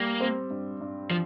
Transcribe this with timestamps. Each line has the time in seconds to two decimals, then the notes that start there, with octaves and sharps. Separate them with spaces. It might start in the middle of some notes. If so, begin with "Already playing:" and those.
Already playing: G3 A#3
0.21 C4
0.50 G2
0.81 G2
1.11 F3